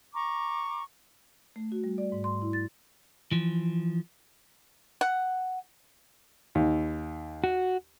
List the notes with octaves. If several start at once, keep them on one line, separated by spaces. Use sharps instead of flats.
A#5 C#6 D6
A3
F#4
G3
D5
G#2
C6
E4
A6
E3 F3
F#5
D#2
F#4